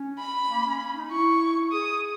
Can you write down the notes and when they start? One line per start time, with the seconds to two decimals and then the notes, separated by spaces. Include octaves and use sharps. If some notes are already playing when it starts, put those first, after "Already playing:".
Already playing: C#4
0.19 B5
0.49 A#3
0.66 C#4
0.81 C#4
0.95 D#4
1.11 E4 C#6
1.72 G#4 D#6